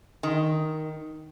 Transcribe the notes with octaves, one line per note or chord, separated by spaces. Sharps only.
D#3